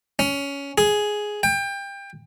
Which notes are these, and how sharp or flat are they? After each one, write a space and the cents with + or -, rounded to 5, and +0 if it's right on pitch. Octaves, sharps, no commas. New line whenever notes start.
C#4 +15
G#4 +5
G5 +25